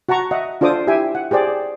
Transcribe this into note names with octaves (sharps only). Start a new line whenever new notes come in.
F#4 F#5 A5 A#5 C#6
D#5 E5 F#5
D4 F4 A4 C5 D6 D#6
E4 G4 E5 G5 G#5
F#5
G4 G#4 C5 D5 G5